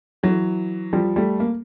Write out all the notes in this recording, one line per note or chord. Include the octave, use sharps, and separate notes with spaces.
E3 F#3
F3 G3
G3 A3
A#3